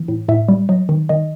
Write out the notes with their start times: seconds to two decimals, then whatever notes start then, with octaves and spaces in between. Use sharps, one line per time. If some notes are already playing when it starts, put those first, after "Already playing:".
Already playing: E3
0.08 A2
0.28 A2 E5
0.48 G3
0.69 F#3 D#5
0.89 D#3
1.09 D#3 D#5